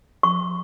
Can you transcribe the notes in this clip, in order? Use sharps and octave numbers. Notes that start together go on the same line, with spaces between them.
C#6